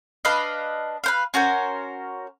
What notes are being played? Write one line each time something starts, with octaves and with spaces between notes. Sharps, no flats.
D4 B4 D#5 F5
B4 C5 F5
C#4 F#4 A#4 C5